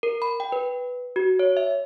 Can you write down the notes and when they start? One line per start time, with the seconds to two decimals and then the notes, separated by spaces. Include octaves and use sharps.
0.03 A#4
0.22 B5
0.40 G5
0.52 B4
1.16 F#4
1.39 C#5
1.57 E5